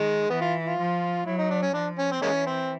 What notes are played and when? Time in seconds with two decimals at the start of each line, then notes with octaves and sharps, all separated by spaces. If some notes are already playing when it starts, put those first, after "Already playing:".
Already playing: D#3 G#3
0.30 E3 B3
0.41 F4
0.65 F4
0.78 F3
1.26 F#3 E4
1.38 D#4
1.50 D4
1.62 C#4
1.74 F3 D4
1.99 C#4
2.11 C4
2.22 E3 G#3 A#3 C#4
2.47 C4